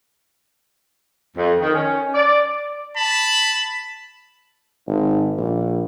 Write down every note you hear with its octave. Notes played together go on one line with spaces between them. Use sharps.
F2
D#3
C#4
D5
A5 B5
G#1
A#1